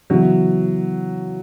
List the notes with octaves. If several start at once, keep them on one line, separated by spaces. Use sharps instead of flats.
C#3 E3 F#3 B3